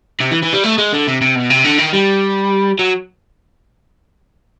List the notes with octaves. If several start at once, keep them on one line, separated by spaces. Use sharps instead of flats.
C3
E3
E3
G3
A3
G#3
D3
C3
C3
B2
C3
D3
D#3
G3
F#3